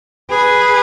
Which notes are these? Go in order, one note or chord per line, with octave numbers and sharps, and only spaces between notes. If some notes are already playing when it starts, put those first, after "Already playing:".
G#4 B4